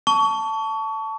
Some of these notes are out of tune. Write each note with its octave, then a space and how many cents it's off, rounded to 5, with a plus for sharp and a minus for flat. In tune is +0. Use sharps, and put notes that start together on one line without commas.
A5 +5 C#6 +30